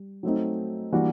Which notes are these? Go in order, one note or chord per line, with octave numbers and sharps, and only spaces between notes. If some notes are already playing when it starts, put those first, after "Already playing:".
Already playing: G3
F#3 A3 C4 D#4
E3 G3 A#3 D4 F#4